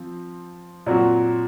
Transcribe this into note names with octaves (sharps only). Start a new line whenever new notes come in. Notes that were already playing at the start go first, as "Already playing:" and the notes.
Already playing: F3 C4
A#2 F#3 C4 F#4